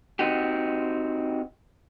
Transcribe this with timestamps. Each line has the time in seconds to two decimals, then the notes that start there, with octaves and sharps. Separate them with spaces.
0.19 C4 D#4 F#4 G4